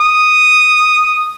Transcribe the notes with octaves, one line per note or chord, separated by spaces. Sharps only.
D#6